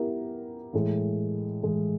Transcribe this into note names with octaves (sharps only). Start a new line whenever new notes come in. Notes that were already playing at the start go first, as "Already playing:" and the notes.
Already playing: B3 E4 G4 A#4
A2 E3 G#3
A2 E3 G#3